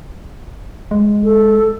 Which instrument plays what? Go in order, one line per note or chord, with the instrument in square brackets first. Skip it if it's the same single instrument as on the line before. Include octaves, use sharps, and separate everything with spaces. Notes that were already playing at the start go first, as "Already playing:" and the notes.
[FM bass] G#3
[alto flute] A4